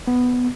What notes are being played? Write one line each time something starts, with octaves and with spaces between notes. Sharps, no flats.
B3